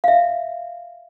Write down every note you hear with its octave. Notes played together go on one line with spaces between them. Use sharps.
E5 F5